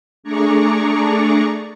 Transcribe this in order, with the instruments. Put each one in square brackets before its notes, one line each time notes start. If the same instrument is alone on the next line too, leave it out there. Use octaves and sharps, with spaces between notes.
[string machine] A3 D4 G#4 D5 A#5 C#6